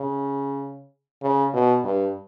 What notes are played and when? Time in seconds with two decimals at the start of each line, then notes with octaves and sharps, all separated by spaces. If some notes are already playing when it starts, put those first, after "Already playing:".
Already playing: C#3
1.23 C#3
1.54 B2
1.84 G2